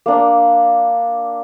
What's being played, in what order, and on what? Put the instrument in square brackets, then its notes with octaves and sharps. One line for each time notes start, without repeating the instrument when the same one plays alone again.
[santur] A#3 D4